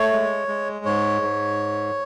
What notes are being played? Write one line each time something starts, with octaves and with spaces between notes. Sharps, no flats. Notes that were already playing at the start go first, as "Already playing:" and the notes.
Already playing: A3 C#5
G#3
G#3
G#2 C#5
G#2